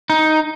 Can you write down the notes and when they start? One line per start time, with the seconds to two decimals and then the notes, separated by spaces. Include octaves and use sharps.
0.10 D#4